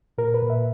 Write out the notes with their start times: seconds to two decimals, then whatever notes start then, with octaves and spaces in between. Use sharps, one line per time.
0.18 A#2 A#4
0.34 B4
0.42 A#2
0.50 E5